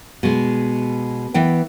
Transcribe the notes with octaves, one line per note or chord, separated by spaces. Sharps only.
B2 G#3
E3 B3 G5